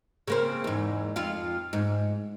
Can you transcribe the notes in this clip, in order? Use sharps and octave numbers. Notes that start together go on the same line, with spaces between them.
C#3 A#3 C4
E2 G#2
F2 F4 F5
G#2